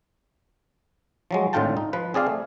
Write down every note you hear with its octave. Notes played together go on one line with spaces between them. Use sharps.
F3 F#3 G#3
G#1 A2 D3 F4 G5 A5
D#4
F3 B4
C4 G#4 D5 F5
A3